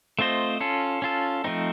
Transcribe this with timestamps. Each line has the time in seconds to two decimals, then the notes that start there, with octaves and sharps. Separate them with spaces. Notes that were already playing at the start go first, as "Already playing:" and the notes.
0.19 A3 C4 F4 C5 D#5
0.60 C#4 F4 A4
1.02 C#4 F4 A4
1.44 F3 A3 C4 D#4